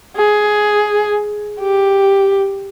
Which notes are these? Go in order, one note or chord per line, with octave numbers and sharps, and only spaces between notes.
G#4
G4